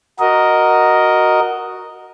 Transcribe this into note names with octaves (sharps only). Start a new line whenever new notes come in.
F#4 A#4 D#5